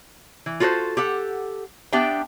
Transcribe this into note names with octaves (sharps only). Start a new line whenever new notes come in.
E3
F4 F#4 A4 A#4 C5
G4 A4 F#5
B3 D4 G4 E5 G5